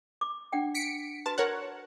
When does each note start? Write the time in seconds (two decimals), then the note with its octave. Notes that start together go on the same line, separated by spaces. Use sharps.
0.21 D6
0.52 D4 F#5 G5
0.74 B6 C#7 D7
1.26 F#4 B4 A5 C6
1.38 A#4 C#5 F#5